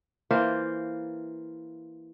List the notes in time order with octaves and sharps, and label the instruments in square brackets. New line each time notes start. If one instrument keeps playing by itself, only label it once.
[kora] E3 A#3 F4 C5